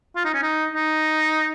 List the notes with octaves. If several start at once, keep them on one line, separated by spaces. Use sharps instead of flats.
F4
D#4
C#4
D#4
D#4